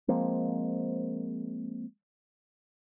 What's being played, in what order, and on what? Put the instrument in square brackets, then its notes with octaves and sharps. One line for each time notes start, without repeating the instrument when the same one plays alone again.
[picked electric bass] F3 G#3 A#3 C4